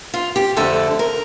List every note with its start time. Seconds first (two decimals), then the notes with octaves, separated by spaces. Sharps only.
0.14 F4
0.36 G4
0.57 F2 D3 A3 A4
0.99 A#4